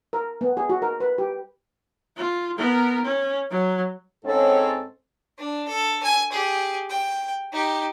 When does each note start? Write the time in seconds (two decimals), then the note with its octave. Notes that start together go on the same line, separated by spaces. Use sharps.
0.13 A#4
0.41 B3
0.57 G#4
0.69 F#4
0.82 A#4
1.00 B4
1.18 G4
2.17 F4
2.57 B3 A#4
3.05 C#4
3.51 F#3
4.25 G#2 C4 C#4 A4
5.38 D4
5.68 A4
6.03 G#5
6.32 G4 G#4
6.90 G5
7.52 D#4 G4